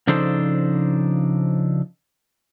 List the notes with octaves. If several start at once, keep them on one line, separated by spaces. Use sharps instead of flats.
C#3 F3 D4 D#4 A4 C5